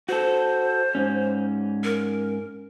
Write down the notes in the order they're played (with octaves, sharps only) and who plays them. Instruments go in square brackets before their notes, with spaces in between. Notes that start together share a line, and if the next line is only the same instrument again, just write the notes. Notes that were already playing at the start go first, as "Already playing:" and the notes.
[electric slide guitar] F#4 A4 [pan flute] C5
[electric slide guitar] G#2 C#4
[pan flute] A#4